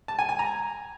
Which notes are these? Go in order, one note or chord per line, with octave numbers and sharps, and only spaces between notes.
A5
G#5
G#5
A#5